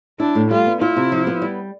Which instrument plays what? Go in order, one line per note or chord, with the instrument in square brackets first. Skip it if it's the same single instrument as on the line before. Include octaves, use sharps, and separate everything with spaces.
[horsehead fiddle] D4 [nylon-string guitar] E4
[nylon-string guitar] A2
[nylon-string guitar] G3 [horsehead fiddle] F4
[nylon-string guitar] B3
[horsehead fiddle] E4 [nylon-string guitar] F4
[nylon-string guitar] C3
F3
B3
G3